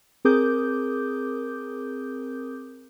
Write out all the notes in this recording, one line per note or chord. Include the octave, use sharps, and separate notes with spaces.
C4 G#4 A#4 D6 D#6 G6